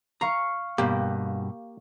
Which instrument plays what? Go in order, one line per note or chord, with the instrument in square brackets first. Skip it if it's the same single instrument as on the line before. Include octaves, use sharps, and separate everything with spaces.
[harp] F5 C#6 C7 [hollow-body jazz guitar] A#5
[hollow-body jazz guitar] G2 B2 [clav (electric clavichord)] A#3 G4